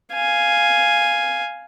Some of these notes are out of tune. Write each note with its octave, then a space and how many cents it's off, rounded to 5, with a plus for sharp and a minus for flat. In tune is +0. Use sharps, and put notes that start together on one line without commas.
F5 +0 G#5 +0